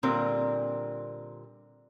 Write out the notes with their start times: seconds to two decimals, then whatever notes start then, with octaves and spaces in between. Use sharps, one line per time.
0.03 A#2 D3 G3 C4 A#4